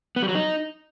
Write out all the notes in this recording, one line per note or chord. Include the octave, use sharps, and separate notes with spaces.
B3
G3
F#3
D#4